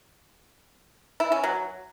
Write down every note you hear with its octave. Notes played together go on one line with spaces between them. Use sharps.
E4
C#4
F#3